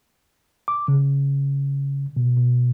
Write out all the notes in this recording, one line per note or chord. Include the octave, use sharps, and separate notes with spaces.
D6
C#3
B2
B2